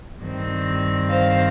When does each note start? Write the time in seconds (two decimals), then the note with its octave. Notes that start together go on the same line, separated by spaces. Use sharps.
0.21 G2 D#3 C4
1.10 C5 F5